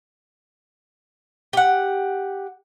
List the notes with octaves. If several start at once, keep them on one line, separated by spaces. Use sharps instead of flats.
G4 F#5